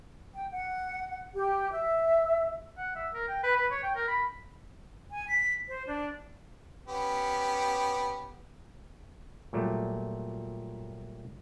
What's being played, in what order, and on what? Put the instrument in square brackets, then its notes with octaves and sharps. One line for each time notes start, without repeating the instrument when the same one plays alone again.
[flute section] G5
F#5
G4
E5
[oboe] F#5
E5
A#4
G5
B4
B4
C#5
G5
A#4
B5
[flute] G#5
B6
C5
D4
[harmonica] B3 C#4 G4
[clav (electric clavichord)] A#2 F#3 G3 A3